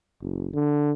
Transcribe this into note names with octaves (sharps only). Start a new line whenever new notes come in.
F#1
D3